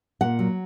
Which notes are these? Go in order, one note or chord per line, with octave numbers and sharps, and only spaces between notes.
A#2 F#5
F#3